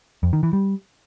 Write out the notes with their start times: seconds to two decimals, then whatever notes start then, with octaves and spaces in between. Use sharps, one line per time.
0.23 F2
0.33 D#3
0.43 E3
0.53 G3